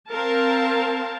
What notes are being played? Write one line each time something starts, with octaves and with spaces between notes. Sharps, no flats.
C4 A#4 F5 A5